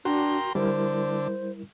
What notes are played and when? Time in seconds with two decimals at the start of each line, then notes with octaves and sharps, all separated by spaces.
0.05 D4 F#4 A#4 G5 C6
0.55 D3 G3 E4 A#4 C5